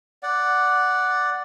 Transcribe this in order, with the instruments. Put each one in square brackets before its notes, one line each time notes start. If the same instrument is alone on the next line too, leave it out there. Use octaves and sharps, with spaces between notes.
[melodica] D5 F#5